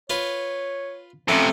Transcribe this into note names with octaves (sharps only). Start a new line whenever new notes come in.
F4 B4 C#5
F2 C3 A3 C#4